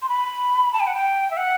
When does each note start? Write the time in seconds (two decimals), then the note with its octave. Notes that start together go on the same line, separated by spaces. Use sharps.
0.02 C6
0.09 B5
0.73 A5
0.80 G5
0.87 F#5
0.95 G5
1.31 E5
1.37 F#5